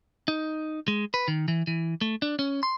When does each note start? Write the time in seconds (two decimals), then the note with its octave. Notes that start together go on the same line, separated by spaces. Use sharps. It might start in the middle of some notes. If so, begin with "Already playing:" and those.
0.28 D#4
0.88 G#3
1.14 B4
1.28 D#3
1.48 E3
1.67 E3
2.01 A3
2.22 D4
2.39 C#4
2.63 C6